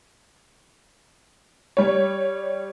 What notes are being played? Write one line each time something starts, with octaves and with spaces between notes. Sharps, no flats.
G3 C#5